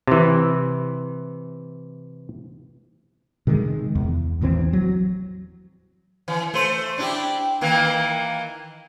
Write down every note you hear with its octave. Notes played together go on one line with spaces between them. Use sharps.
C3 E3
C3 D#3 F3 G#3
E2
A1 E2 E3 C4
F#3
E3
A3 C5
D4 E4 G4
D#3 E3 A#3